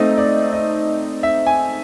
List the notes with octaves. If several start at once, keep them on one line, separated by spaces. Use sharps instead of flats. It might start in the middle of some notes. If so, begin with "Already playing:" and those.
Already playing: A3 C4 D#4 D#5
D5
D#5
E5
G#5